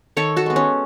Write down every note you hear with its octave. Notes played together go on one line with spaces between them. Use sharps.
D#3 A4 C#5
F#4 A4
G#3 B3
C#4